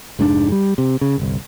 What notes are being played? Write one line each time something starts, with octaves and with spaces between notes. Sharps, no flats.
F1 G#2 C4 D4
G3
C3
C#3
G1 C2